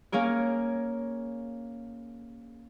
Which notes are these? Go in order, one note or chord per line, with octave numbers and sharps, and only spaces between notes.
A#3 C#4 G#4 A#4